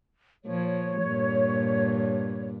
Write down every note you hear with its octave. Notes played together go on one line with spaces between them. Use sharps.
A#2 F3 C#5
G2 A#2